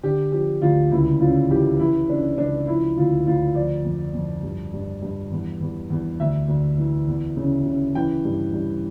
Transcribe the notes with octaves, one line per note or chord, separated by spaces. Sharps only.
D3 G4
F3 G4
D2 F4
C#2 E4
C#3 F4
E3 G4
E3 E4
C#3 D4
C#2 D4
F3 E4
D2 F4
D2 F4
F3 D5
F2
F2
G2
G2
G2
E2
E2
E2
D2 E5
D2
E3
E2
C#3
C#3
E3 G5
G2
G2